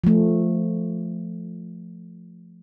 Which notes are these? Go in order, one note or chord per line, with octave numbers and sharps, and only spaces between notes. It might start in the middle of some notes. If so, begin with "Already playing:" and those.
F3 A3